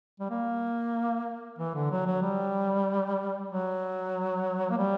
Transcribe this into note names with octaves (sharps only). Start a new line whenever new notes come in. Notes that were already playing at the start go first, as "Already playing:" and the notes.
G3
A#3
E3
D3
F#3
F#3
G3
F#3
A#3
G3